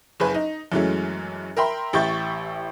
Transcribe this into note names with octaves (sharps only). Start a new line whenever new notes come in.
F#1 G#4 B4
D#4
F#2 E3 F#3 G#3 A3 C#4
A#4 E5 G5 B5 C6
A1 G4 E5 C#6 G6 A6